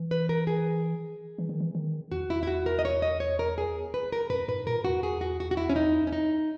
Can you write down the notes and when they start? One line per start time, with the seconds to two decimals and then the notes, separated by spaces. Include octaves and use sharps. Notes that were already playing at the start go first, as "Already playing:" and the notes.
Already playing: E3
0.11 B4
0.29 A#4
0.47 G#4
1.38 E3
1.49 D#3
1.60 E3
1.75 D#3
2.12 E2 F#4
2.30 E4
2.43 E4
2.47 F#4
2.66 A#4
2.79 D#5
2.85 C#5
3.02 D#5
3.20 C#5
3.39 A#4
3.58 G#4
3.94 B4
4.12 A#4
4.30 F#2 B4
4.48 G#2 B4
4.67 A#2 A#4
4.85 E2 F#4
5.03 G#4
5.21 F#4
5.40 F#4
5.51 F#4
5.57 E4
5.70 C#4
5.76 D#4
6.07 C#4
6.12 D#4